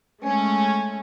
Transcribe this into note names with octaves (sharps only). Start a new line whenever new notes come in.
G#3 A3 C#4